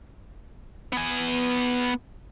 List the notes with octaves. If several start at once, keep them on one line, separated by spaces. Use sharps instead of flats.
B3 G#5